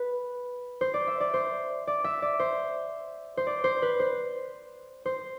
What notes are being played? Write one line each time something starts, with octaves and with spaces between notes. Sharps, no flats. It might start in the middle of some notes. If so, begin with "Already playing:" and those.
Already playing: B4
C5
D5
E5
D5
C5
D5
E5
D5
C5
C5
D5
C5
B4
C5
C5